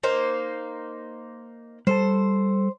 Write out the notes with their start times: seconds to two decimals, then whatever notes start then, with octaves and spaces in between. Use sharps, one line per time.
0.03 A#3 D#4 C5
1.87 G3 A4 C5 A5